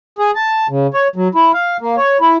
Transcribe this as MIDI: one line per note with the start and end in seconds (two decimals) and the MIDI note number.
0.19 0.31 68
0.35 0.67 81
0.69 0.87 49
0.94 1.08 73
1.16 1.28 54
1.35 1.52 64
1.54 1.77 77
1.81 1.96 58
1.97 2.17 73
2.21 2.37 64